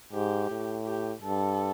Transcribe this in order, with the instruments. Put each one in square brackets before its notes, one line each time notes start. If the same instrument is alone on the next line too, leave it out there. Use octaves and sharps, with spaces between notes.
[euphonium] G#2 [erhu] G4
[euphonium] A2
[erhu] G4
[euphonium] G2 [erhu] A4